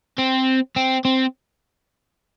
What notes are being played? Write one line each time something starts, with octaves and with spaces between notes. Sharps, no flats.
C4
C4
C4